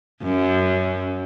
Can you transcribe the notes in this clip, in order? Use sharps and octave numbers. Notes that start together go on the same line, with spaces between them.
F#2